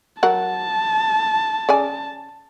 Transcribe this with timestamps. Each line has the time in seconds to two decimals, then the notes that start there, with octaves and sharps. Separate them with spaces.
0.23 F#3 A#4 F#5 A5
1.69 C#3 D5 G#5